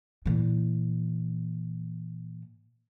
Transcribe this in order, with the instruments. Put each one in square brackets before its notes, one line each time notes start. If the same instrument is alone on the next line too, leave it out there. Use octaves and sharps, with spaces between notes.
[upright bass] A#2 E3